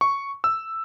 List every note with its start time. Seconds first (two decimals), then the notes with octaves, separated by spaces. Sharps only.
0.01 C#6
0.44 E6